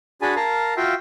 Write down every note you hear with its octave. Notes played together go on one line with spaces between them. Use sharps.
D4 F#4 G#4 G#5 A5 B5
A#4 F5 A5 A#5
F4 F#4 E5 F5 G5